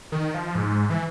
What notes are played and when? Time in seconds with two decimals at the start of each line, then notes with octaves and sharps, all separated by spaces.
0.12 D#3
0.34 F3
0.55 G#2
0.90 E3